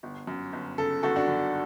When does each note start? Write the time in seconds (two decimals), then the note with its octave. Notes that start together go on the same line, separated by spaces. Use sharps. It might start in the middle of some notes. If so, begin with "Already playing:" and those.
0.03 G1
0.27 F#2
0.53 G1
0.78 C#3 A4
1.03 G1 F#4 A4
1.16 D4 F#4
1.28 F#2